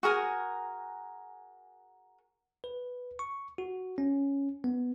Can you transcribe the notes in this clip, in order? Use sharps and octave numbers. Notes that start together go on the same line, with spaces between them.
F#4 G#4 A#4 G#5
B4
C#6
F#4
C#4
B3